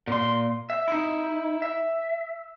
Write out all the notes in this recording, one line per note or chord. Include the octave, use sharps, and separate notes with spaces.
A#2 C6
E5
D#4 E4
E5